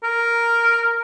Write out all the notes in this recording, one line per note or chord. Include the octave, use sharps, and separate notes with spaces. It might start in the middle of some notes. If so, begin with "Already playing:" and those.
A#4